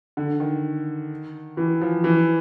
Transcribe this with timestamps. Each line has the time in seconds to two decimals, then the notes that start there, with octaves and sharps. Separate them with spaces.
0.17 D3
0.40 D#3
1.57 E3
1.81 F3
2.04 E3